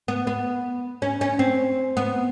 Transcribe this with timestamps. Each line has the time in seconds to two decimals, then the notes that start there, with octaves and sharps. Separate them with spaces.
0.08 B3
0.27 B3
1.02 C#4
1.21 C#4
1.39 C4
1.97 B3